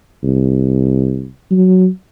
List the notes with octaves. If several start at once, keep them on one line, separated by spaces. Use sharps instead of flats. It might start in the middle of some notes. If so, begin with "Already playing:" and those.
C2
F#3